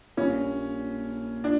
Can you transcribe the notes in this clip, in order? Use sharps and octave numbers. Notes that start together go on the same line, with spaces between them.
A#1 A#2 G3 C#4
D4